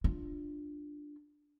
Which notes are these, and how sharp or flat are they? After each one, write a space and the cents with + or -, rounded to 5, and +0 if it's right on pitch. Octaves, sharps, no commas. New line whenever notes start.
D4 +5 F4 +0